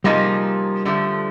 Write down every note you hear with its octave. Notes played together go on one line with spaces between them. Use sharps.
C3 F3 G3 A#3 D#4 G#4
D3 F3 A3